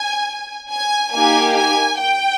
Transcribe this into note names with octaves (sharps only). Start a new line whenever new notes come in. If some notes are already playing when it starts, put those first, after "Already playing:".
Already playing: G#5
G#5
A#3 D#4 G4 G#5
G#5
G5